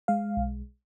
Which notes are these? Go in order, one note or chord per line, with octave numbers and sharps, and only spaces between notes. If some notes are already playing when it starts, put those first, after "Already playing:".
G#3 F5
B1